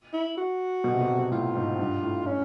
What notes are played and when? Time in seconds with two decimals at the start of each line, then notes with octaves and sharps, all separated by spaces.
0.13 E4
0.37 F#4
0.84 B2
0.94 C3
1.01 B2
1.10 C3
1.18 B2
1.31 A2 F4
1.55 G#2
1.79 G2
2.02 A2
2.26 C#4